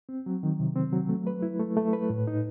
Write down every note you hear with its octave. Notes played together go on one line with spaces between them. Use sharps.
C4
F#3
D#3
C3
C4
F#3
A3
B4
E4
A3
A3
B4
A2
D#4